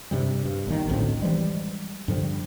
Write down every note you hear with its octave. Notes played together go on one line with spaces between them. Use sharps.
G2 C3 G3
G2
G1 A#2 D3 D#3
A1 D2 A2 C4
E3 F3 G3 G#3
G2 D3 F3 G3